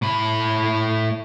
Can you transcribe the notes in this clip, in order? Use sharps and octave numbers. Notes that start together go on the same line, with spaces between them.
A2 B5